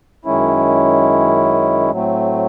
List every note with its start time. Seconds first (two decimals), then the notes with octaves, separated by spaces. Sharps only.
0.25 F#2 D#3 G#3 C#4 E4
1.92 A2 F#3 A3 C4